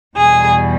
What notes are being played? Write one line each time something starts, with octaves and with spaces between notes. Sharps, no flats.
E2 B2 G3 G#4